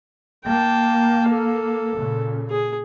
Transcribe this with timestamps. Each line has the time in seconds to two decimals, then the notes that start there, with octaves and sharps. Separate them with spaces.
0.46 A#3 G5 A5
1.29 A4
1.98 A#2 C#3
2.50 G#4